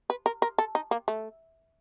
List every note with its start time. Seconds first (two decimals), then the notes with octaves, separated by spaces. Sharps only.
0.10 B4
0.26 A#4
0.42 A#4
0.58 A4
0.75 D#4
0.91 A#3
1.08 A3